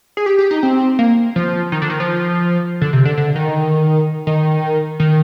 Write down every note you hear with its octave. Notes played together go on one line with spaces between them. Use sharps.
G#4
G4
G4
D#4
C4
A#3
F3
D#3
D3
D#3
F3
D3
C3
D3
D3
D#3
D#3
D#3